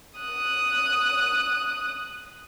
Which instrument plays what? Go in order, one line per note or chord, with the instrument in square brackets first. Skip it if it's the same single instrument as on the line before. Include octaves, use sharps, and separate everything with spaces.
[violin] D#6 F#6